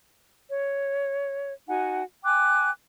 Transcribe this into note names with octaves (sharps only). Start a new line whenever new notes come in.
C#5
D#4 F#4 F#5 G#5
G5 G#5 D6 F#6